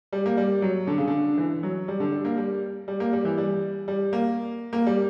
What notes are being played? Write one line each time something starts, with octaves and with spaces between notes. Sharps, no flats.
G3
A#3
G3
F#3
D3
C#3
D3
E3
F#3
G3
D3
G3
A#3
G3
G3
A#3
G3
E3
G3
G3
A#3
A#3
G3